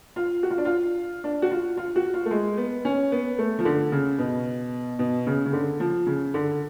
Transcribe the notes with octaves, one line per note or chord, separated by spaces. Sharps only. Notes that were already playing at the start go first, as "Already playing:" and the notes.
F4
F#4
F4
D4
F4
D4
F#4
F4
F4
F#4
F4
A3
G#3
B3
C#4
B3
A3
F3
D3
C#3
B2
B2
C#3
C#3
D3
F3
C#3
D3